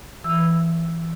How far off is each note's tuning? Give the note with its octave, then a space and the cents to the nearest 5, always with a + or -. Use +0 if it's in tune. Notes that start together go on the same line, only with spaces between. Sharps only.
E3 +10 E6 +0